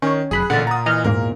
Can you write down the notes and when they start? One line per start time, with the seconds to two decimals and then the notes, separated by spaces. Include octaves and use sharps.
0.02 D#3 C#4 C#5
0.31 F1 F#2 G#4 B5 F#6
0.50 A1 A#2 D3 F#5 A6
0.67 A#5 D#6
0.86 E3 D#5 F6
1.04 E2 G#2 A#3 A#4